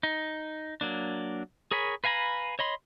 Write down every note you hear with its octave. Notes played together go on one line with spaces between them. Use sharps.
D#4
F#3 A#3 D4
G#4 A#4 C#5 G#5 B5
B4 F5 G#5 A#5 B5
C#5 D#5 B5 C6